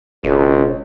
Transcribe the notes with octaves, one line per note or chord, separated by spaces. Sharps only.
E1 C#2